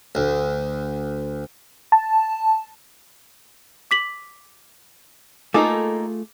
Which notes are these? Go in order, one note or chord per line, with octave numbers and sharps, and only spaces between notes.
D2
A5
D6 B6 F#7
A3 A#3 D#4 F4 G#4 A4 D6